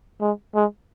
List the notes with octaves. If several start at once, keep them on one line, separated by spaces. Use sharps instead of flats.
G#3
G#3